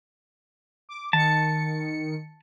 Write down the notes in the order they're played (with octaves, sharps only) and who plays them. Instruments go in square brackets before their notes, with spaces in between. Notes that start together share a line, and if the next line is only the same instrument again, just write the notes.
[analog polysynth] D6
[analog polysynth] D#3 C#7 [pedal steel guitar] A5